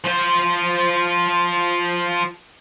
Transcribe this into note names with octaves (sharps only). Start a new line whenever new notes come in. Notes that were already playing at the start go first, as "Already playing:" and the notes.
F3 C5